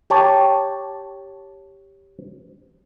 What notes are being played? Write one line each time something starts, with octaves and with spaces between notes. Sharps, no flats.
G4 C#5 A5